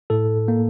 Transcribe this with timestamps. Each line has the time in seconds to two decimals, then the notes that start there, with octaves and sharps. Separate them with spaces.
0.10 A2 A4
0.48 A#3